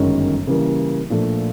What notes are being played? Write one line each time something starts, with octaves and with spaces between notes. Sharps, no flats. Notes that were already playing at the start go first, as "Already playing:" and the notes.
Already playing: G1 F#2 D#3 G#3 C#4
C#3 E3 G3 A#3
A#2 F3 A3 D4